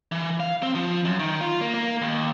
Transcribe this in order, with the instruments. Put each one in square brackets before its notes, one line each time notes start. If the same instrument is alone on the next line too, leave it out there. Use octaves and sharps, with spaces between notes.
[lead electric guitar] E3
F5
C4
F3
F#2
D#3
F4
A#3
A#3
D#2